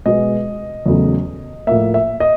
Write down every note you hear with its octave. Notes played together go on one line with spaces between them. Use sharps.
B2 G#3 B3 D#5
E2 C#3 F#3 A3
A2 F3 A#3 E5
E5
D#5